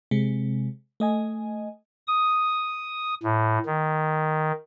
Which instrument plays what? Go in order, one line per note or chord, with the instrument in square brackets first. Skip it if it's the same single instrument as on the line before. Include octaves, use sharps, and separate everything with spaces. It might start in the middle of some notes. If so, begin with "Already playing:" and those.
[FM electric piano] C3 G#3
A3 D#5 G#5
[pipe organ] D#6
A2
D#3